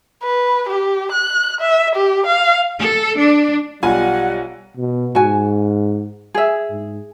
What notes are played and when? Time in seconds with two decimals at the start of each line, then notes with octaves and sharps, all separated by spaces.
0.23 B4
0.68 G4
1.11 F#6
1.61 E5
1.95 G4
2.26 F5
2.79 A4
3.19 D4
3.83 B1 G3 F4 F#5 G#5
4.77 B2
5.15 G#2 F#4 G#5
6.34 G#4 E5
6.70 G#2